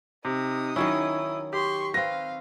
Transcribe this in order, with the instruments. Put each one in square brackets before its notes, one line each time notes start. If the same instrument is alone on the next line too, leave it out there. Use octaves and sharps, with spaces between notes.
[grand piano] C3 [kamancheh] D#4 D#6
[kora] D#3 F#3 C#4 [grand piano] E4
[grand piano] G4 [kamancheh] C6 C#6
[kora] C4 B4 [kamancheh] F5 [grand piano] A#6